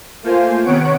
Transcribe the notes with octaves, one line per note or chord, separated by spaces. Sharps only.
A3 A#3 F4 C5 G#5
C3 D#3 B3 C#5 F#5 D7